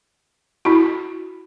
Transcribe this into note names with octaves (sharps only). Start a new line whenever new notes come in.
E4 F#4